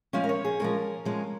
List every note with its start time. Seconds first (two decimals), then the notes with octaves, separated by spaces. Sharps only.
0.13 F3 G#3 C#4 F5
0.24 A#4
0.29 C#5
0.45 G#4
0.60 F3 G#3 C#4 A#4
1.05 F3 G#3 C#4